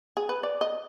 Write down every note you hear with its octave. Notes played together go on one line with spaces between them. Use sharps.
G#4
B4
D5
D#5